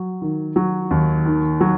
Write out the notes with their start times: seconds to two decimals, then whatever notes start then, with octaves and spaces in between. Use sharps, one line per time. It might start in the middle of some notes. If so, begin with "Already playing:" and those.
Already playing: F#3
0.22 D#3
0.56 F#3
0.91 D#2
1.26 D#3
1.61 F#3